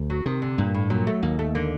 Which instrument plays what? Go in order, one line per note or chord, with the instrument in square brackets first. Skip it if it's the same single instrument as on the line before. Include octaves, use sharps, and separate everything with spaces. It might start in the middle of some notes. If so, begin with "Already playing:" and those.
Already playing: [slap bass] D2
[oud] F#3
[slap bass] C3 [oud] D#3
[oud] D3
[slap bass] G2 [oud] A#2
[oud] A2
[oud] A#2 [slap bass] F#3
[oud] A3
[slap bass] D#2 [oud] A#3
[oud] A3
[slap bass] D3 [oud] A#3